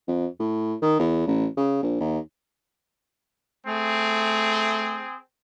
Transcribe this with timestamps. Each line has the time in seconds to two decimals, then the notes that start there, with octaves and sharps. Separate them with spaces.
0.08 F2
0.39 A2
0.82 D#3
0.99 E2
1.27 A1
1.57 C#3
1.82 A#1
2.00 D#2
3.66 A3 C4 G#4